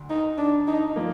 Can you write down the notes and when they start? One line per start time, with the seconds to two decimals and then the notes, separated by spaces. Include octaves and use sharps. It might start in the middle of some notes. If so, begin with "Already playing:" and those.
Already playing: D2 D3
0.10 D#4
0.38 D4
0.68 D#4
0.96 F3 A#3